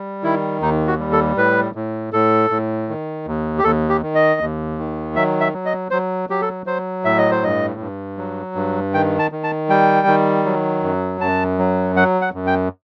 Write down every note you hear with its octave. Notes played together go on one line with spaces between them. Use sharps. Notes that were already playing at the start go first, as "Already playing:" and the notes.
Already playing: G3
D#3 E4
D#2 D#4
F#4
G3
A4
A2 B4
A2
A2 A4
A2
D#3
D#2
G4
D#2 A4
G4
D#3
D#5
D#2
D#3
F#3 E5
E5
F#3
D#5
F#3 C5
F#3 G4
A4
F#3 C5
A2 E5
D#5
C5
G2 D#5
G2
F#3
G2
D#3 G5
A5
D#3
A5
G3 G5
D#3
F#3
F#2
F#2 A5
F#3
F#3 F#5
F#5
F#2
G5